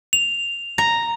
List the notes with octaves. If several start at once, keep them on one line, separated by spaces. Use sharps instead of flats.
F7
A#5